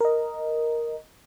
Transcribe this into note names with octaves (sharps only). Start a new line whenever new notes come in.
A#4 D#5